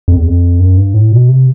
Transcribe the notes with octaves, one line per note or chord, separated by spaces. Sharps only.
F2
E2
F2
F#2
G2
A2
B2
C3